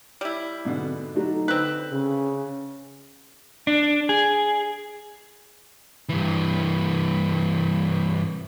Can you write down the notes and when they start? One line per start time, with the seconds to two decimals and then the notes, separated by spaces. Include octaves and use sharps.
0.21 G3 E4
0.65 G#2 B2 D3
1.15 F#3 A3 D4 D#4
1.48 D3 C4 B4
1.92 C#3
3.67 D4
4.09 G#4
6.09 G2 E3